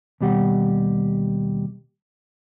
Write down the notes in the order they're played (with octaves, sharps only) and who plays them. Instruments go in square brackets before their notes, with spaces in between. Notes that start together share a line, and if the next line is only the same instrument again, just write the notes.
[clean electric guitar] D#2 B2 G3 G4 F#5